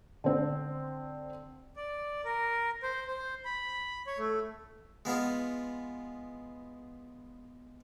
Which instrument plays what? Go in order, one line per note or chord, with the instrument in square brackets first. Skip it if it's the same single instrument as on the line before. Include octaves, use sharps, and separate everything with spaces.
[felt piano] D3 C4
[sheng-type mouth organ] D5
A#4
C5
C5
B5
C#5
A3
[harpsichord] G#3 B3 F4 G#4